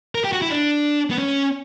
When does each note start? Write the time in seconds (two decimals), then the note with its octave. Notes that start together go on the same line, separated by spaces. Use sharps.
0.15 A#4
0.24 G4
0.33 F#4
0.42 E4
0.51 D4
1.11 B3
1.18 C#4